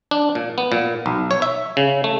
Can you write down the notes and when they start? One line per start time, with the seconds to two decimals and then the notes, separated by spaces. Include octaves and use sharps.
0.11 D4
0.35 A#2
0.58 B3
0.72 A#2
1.06 B1
1.31 C#5
1.42 E5
1.77 C#3
2.04 A3